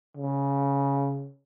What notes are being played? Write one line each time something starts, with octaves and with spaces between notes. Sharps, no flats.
C#3